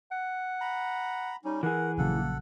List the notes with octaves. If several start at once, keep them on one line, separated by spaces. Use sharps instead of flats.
F#5
A#5 B5
G3 C#4 D#4
E3 G#4 A#4 F#5
A#1 C#3 F#3 A#3 A4 F#5